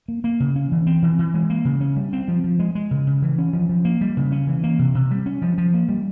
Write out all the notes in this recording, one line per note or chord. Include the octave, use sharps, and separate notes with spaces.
A#3
A#3
C#3
C#4
E3
C4
E3
E3
G#3
A#3
C#3
C#4
G3
C4
F3
F3
G#3
G#3
C#3
C#3
E3
C#4
F3
F3
A#3
G3
C#3
C#4
E3
A#3
C3
C3
G3
C#4
F3
F3
A#3
G3